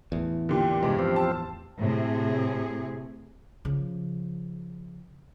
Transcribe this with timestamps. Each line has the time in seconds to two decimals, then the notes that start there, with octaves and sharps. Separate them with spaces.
0.12 E2 A2
0.49 A#2 D3 G4
0.83 G2 C3 G#3
0.99 F3 C4
1.16 A5
1.79 A2 C3 G#4
3.65 C#3 F3